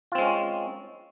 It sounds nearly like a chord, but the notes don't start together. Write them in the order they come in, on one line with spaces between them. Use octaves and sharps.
F4 C4 G#3 C#4